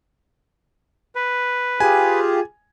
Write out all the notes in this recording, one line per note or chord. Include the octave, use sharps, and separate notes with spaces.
B4
F4 G4 G#4 G#5